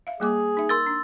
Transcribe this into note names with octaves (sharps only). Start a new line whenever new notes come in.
E5 F5
G3 A#3 G#4 D6
D#4 E5
A#4 C6 E6 A6
D4